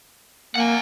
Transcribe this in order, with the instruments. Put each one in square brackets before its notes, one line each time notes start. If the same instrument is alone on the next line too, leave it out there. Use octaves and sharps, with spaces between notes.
[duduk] A#3 [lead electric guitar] F#5 G#5